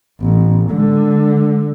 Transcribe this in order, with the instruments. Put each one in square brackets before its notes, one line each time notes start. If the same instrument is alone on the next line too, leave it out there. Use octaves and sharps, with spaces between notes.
[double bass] A1 [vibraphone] B3
[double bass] D3 [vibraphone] G#3